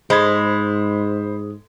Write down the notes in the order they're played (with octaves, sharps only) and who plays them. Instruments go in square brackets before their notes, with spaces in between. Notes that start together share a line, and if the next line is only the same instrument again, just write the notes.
[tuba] G#2 [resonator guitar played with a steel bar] G#3 [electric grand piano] C5 B5 G#6